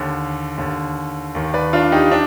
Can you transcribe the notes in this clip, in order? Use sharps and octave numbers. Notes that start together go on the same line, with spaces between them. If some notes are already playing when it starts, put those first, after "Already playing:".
Already playing: D#2 D3
D#2 D3
D#2 D#3
B4 D5
D4 F4
D#4 G4
D4